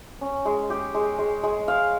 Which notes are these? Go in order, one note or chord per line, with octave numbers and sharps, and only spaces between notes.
C#4
G#3
G4
G#3
G#3
G#3
F5